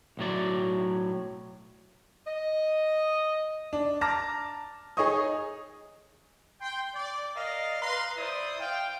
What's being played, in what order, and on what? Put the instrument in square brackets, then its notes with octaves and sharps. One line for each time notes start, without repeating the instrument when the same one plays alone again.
[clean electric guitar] B1 A2 F#3 D5
[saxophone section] D#5
[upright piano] D4
A5 A#5 D6 F6 A#6
D#4 G#4 C#5 D#5 C#6 D#6
[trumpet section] G5 C6
D5
A#4 D5 D#5 F5
B4 F5 A#5 C6
E4 C5 D5 D#6
F5 G5